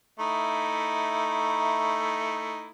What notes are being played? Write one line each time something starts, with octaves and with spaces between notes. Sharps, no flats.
A3 D#4 E4